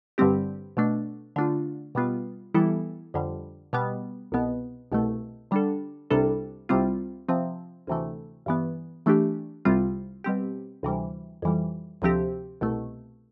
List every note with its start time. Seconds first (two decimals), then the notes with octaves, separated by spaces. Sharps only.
0.18 G2 D3 G3 C4 G4
0.77 B2 A3 D4
1.36 D3 A3 D4 F4
1.95 B2 G3 B3 F4
2.54 E3 G3 B3 E4 A4
3.14 F2 D3 G3
3.73 B2 G3 B3
4.32 C2 B2 B3
4.92 C2 B2 A3
5.51 D3 G3 D4 A4
6.11 C2 C3 G3 D4 A4
6.69 C2 C3 G3 C4 F4
7.29 C3 F3 C4
7.87 D2 C3 E3 A3
8.46 G2 E3 B3
9.06 E3 A3 D4 G4
9.65 C2 C3 G3 C4 F4
10.24 B2 G3 C4 G4
10.83 D2 C3 E3 G3
11.42 F2 E3 G3
12.02 D2 C3 F3 C4 G4
12.61 C2 B2 A3